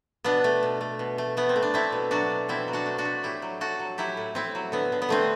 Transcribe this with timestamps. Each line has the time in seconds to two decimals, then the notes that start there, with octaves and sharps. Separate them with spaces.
0.24 B2 B3 D4
0.44 A3
0.63 B2
0.81 A3
0.99 B2
1.18 A3
1.37 A3 B3
1.49 C4
1.56 A3
1.63 D4
1.74 A3 C4 E4
1.92 B2
2.11 F#3 D4 F#4
2.30 B2
2.48 B2 C4 E4
2.68 F#3
2.73 D4 F#4
2.86 A3
2.98 D4 F#4
3.05 A3
3.23 A2 E4 G4
3.42 F#3
3.60 F#3 F#4 A4
3.80 F#3
3.98 F#3 E4 G4
4.17 A2
4.35 A2 C4 E4
4.55 F#3
4.72 D3 B3
4.92 D3
5.02 B3
5.09 D3 A3 C4